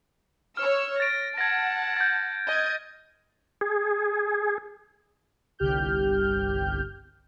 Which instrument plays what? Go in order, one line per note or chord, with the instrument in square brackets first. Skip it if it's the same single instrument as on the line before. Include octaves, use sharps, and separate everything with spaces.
[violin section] C#5 E6 [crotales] F6
[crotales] A6 D7 [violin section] A#6
[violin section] F#5 A5 [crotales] G#6 A#6
[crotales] G6 A6
[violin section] D#5 G#6
[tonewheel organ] G#4
[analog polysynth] G1 C2 G4 F6 G6